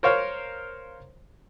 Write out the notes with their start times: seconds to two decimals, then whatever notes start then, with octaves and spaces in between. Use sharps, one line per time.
0.03 A#4 C5 C#5 F5